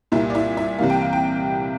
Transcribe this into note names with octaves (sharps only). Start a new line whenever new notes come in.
C2 A#2 G3 A#3 E4 E5
D5
E4 E5
E4 E5
C2 C3 E3 G3 A#3 F5
G5
F5
G5